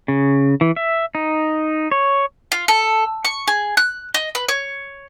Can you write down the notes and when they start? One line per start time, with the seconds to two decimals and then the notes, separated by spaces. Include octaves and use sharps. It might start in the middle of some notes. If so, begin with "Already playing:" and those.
0.08 C#3
0.61 E3
0.76 E5
1.15 D#4
1.91 C#5
2.52 F4
2.68 A4
3.25 C#6
3.48 G#4
3.77 F#6
4.14 D#5
4.35 B4
4.48 C#5